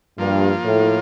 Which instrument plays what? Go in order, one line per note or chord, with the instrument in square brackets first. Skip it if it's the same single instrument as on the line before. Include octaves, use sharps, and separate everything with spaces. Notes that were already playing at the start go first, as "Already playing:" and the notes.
[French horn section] G2 [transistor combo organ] F3 A#3 F4
[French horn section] A2